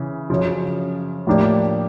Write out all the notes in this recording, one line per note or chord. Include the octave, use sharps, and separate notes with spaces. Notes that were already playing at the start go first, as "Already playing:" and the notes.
Already playing: C#3 E3
F#2 C#3 F3
A2 F3 A#3 D4 G4